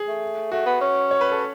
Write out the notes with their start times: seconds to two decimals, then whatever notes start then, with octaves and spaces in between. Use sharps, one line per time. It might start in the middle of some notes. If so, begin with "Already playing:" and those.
Already playing: G#4
0.08 A3
0.52 A3 F#4
0.66 B3
0.81 C#4
1.11 C#5
1.21 B4
1.31 A4